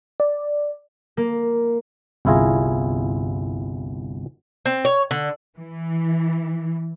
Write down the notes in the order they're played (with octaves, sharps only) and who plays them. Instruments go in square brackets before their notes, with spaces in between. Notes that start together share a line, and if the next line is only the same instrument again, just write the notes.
[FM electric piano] D5
[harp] A#3
[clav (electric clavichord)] G1 C2 E4 F4 G#4 A#5
[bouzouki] C4
C#5
D3
[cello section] E3